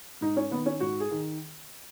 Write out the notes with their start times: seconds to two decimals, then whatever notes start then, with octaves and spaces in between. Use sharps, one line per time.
0.21 G#2 D#4
0.37 C#4
0.51 D#3 B3
0.66 C#4
0.80 G#2 F#4
1.00 G#4
1.11 D#3